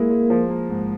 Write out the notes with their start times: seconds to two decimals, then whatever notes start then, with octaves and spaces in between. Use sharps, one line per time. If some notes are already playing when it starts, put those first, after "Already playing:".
Already playing: G#3 A#3 E4
0.10 G#3
0.30 F3
0.49 A#3
0.70 G#2